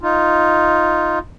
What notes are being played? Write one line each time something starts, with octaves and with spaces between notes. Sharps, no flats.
D#4 F4